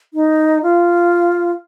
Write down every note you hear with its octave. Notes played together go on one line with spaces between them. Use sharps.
D#4
F4